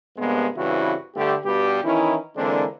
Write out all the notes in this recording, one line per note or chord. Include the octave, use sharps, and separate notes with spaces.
G2 C3 G#3 A#3 B3
G2 C#3 E3 C4 E4 F#4
G2 D3 A3 G4
G2 B2 G3 G4
D#3 E3 C#4 D#4 E4
D3 E3 G#3 A#3 C4 D4